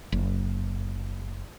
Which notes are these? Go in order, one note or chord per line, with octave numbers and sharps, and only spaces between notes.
F#1